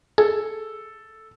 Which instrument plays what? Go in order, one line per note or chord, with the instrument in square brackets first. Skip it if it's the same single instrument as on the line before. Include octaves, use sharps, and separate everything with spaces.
[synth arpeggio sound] G#4 [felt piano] A4